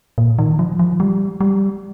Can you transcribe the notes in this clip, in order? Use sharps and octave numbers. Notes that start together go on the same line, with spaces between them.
A#2
D#3
F3
F3
G3
G3